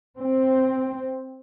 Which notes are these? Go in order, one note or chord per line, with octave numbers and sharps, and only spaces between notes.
C4